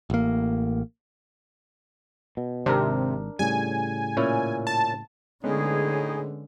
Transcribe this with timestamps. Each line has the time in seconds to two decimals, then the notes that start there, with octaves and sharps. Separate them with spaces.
0.10 A1 A#3
2.37 B2
2.66 G#1 C3 D4 A#4
3.39 A2 C#3 G3 G#5
4.17 A#2 C#4 E4
4.67 A5
5.44 A2 D3 G#3 B3 C#4 D#4 G#4